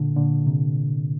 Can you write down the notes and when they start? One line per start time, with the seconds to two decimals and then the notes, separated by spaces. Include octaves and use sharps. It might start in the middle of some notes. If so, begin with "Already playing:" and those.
Already playing: A#2 D3
0.16 A#2 D3
0.47 C3